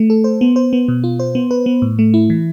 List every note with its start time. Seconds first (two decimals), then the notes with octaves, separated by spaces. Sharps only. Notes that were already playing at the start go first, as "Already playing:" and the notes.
Already playing: A3
0.10 A4
0.24 C5
0.41 B3
0.56 C5
0.73 B3
0.88 B2
1.04 F4
1.20 C5
1.35 B3
1.51 B4
1.66 B3
1.82 A2
1.99 A3
2.14 E4
2.30 E3